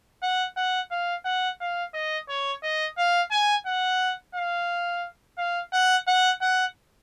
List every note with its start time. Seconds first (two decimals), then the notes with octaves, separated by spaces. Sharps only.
0.22 F#5
0.56 F#5
0.91 F5
1.25 F#5
1.60 F5
1.94 D#5
2.29 C#5
2.63 D#5
2.98 F5
3.31 G#5
3.67 F#5
4.35 F5
5.38 F5
5.73 F#5
6.07 F#5
6.41 F#5